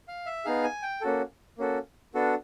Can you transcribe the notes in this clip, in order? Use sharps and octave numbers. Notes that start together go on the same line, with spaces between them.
F5
E5
B3 D#4 G#4 F5
G#5
G5
A#3 C#4 F#4 A4
A#3 C#4 F#4 A4
B3 D4 F#4 A4